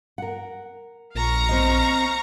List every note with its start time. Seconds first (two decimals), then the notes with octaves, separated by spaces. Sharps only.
0.18 A#4 F#5
1.15 A#1 F5 A#5 C#6
1.49 C4 C5 D#5